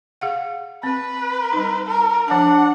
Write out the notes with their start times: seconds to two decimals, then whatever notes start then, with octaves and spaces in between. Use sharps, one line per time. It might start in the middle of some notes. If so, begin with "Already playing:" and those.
0.21 G#4 F5 F#5
0.83 C4 B4
1.53 G3 D#4
1.87 A#4
2.28 F3 D4 F#5 A5